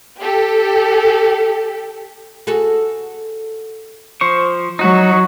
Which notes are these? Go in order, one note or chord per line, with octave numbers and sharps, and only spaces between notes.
G4 A4
F#4 G#4 A4
F3 C5 C#6
F#3 D#4 F#4